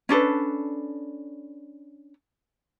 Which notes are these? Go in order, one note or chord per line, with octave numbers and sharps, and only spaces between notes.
C#4 D4 A4 B4